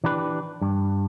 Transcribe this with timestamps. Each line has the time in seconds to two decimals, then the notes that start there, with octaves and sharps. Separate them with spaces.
0.04 E3 D4 G4 B4
0.62 G2